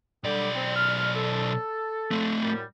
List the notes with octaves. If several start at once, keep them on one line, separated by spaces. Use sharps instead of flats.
B1 D3 G3 G4 D5
C4
F6
A4
A3 C4
F#2 A2 G3